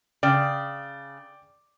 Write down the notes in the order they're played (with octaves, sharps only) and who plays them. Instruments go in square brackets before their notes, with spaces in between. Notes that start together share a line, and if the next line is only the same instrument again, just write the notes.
[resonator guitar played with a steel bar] C#3 [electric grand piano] D5 G5